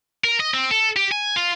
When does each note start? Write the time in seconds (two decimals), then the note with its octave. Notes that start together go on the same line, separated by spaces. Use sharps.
0.24 A#4
0.40 D#5
0.54 C4
0.71 A4
0.97 G4
1.12 G#5
1.36 F4